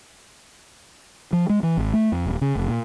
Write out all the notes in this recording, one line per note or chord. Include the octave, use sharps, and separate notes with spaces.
F3
G#3
E3
G#1
A3
F2
D#1
C#3
F1
A#2